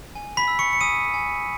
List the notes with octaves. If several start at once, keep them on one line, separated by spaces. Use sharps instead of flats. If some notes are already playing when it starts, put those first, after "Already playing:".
G#5
B5 B6
E6
C#6 C#7
C#7
G#5 D#6 D#7
G#5